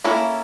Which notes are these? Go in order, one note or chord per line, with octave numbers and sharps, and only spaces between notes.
A#3 C#4 E4 A4